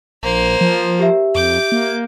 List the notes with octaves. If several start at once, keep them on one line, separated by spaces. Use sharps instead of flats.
A#1 A#3 C5
F3
G4 E5
F2 D6 G6
A#3